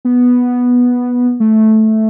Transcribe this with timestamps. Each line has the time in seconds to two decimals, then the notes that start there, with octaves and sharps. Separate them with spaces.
0.05 B3
1.40 A3